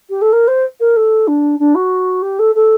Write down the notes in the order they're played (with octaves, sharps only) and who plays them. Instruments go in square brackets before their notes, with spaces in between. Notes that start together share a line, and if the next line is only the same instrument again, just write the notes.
[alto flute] G4
A4
A#4
C5
A#4
A4
D4
D4
F#4
G4
A4
A4